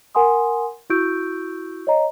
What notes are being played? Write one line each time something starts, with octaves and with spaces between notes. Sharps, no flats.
A#4 F#5 G#5 C6 D#6
E4 F#4 C#6 E6 G6 D7
C#5 D#5 A#5